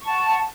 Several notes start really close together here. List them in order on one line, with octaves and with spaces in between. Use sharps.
C#6 A5 F#5